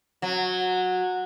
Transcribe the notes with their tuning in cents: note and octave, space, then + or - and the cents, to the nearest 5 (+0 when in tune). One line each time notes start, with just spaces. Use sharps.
F#3 -15